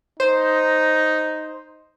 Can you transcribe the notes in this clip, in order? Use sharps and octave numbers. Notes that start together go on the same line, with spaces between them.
D#4 C5